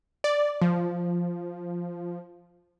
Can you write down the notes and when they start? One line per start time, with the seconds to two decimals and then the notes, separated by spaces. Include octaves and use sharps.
0.24 D5
0.61 F3